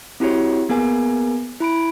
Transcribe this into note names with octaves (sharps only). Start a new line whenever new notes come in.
C4 E4 F#4 G4 C#5
A#3 B3 G#4 A#4 G#5
E4 B5 D7